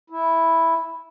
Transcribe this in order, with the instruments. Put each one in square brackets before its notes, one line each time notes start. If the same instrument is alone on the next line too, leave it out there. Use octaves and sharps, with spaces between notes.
[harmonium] E4